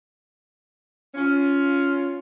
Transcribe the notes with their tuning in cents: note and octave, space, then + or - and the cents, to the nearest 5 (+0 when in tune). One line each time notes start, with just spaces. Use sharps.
C#4 +15 F4 +0